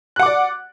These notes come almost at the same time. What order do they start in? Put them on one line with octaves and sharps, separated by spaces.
F#6 F#5 D6 D5